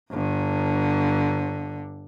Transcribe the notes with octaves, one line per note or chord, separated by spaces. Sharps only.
G1 D3